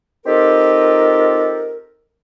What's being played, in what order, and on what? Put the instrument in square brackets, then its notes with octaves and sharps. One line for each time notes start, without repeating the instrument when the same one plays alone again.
[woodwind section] C4 D#4 F4 G4 A4 A#4